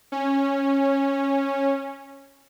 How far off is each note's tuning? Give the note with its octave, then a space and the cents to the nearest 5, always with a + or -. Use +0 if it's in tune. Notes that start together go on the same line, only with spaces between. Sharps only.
C#4 -10